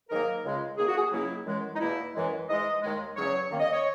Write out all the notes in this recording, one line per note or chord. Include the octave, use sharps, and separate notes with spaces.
G#2 D#3 F#3 A#3 A#4
C#2 C#3 G#3
F#2 D#3 A#3 G#4
F#4
G#4
C#2 C#3 F#3 A#3 E4
F#2 E3 G#3
D#4
E2 B2 A#3 E4
F#2 E3 G#3
G#2 E3 G#3 D#5
D#2 D#3 G#3
E2 C#3 F#3 C#5
F#2 D#3 A#3
D#5
C#5